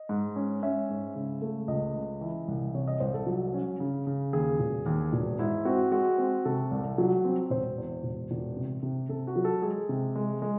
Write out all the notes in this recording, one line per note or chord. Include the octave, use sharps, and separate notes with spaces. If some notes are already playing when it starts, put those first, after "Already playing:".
Already playing: D#5
G#2
C#4
C#4 E5
G#2
C#3
A3
C#2 D#5
C#3
E3
C2
C3 C#5
D#5
C2 C5
A4
F#3
C#4
C#3
C#3
D#2 G#4
E1
D#2
E1
G#2 E4
C4 F#4
G#3 F#4
C4
C3 A4
C2
F#3
C4
E1 C5
E2
E1
E1
C3
C3
C3 A4
F#4
F#3
A4
G#3 G#4
C3
G#3
G#3